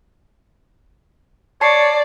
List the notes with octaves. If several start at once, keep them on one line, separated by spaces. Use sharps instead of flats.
C#5 D5 A5 C7